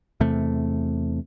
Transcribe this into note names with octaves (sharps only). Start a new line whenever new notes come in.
E2 C3 A3